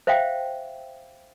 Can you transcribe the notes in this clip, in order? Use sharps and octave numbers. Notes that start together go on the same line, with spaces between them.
C5 E5 F5 G5